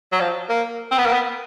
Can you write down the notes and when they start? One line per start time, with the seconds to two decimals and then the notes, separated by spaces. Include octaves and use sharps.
0.13 F#3
0.20 F3
0.49 A#3
0.91 C4
0.98 B3
1.06 A#3
1.13 B3